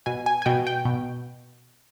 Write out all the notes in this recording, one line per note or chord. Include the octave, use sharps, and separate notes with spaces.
B2 G#5
G#5
G#5
B2 G5
G5
B2